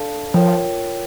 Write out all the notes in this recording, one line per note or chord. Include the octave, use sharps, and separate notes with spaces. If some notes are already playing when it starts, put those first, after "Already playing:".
Already playing: D4 A4 D5 F5 A5
F3 F4 A#4 C#5 G5